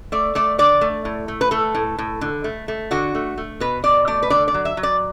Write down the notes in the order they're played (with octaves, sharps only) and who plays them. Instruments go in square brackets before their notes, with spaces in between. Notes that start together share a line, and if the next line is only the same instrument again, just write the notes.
[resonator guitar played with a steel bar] A3 D5
A3 D5
D3 D5
A3
A2
A3
B4
A3 A4
A2
A2
D3
A3
A3
D3 F#4
A3
A3
B2 B4
B2 D5
A3 D5
B4
D3 D5
D5
F#3
E5
F#3
D5